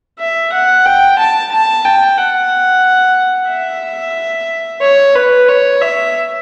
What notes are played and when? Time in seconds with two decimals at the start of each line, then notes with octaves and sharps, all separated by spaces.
0.19 E5
0.52 F#5
0.85 G5
1.18 A5
1.52 A5
1.84 G5
2.18 F#5
3.50 E5
4.82 C#5
5.15 B4
5.48 C#5
5.81 E5